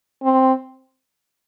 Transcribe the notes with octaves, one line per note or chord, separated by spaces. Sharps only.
C4